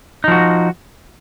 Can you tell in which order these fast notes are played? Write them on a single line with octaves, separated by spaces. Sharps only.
D#4 F3 F#4